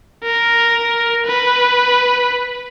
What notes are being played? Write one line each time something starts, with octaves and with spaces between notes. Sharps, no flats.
A#4
B4